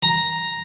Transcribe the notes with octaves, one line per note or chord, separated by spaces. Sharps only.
A#5